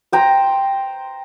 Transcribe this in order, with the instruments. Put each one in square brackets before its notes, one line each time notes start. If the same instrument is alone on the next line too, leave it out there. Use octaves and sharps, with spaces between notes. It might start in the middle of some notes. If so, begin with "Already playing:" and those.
[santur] C5 G5 A#5